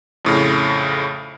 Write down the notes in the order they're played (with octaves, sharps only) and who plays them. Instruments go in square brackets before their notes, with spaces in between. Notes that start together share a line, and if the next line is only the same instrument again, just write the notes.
[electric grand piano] F2 A2 C#3